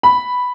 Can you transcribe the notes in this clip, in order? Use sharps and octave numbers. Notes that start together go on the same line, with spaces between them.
B5